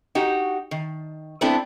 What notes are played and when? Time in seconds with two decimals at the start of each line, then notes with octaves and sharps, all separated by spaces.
0.15 D#4 F#4 G4
0.71 D#3
1.41 A3 B3 C4 D4 E4 A4